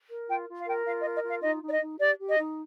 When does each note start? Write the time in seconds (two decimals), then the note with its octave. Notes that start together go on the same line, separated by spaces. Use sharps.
0.10 A#4
0.28 F4 G5
0.48 F4
0.60 F5
0.66 A#4 G5
0.86 F4 F5
1.00 D#5
1.05 A#4
1.14 D#5
1.23 F4
1.28 F5
1.42 D#4 D#5
1.62 D#4 D5
1.71 D#5
1.81 D#4
1.99 G4 D5
2.18 G4
2.28 D#5
2.38 D#4